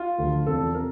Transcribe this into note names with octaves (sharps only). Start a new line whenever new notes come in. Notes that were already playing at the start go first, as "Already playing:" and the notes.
Already playing: F4
D2 D3 F3
E2 C3 F3 A4
C3 A#4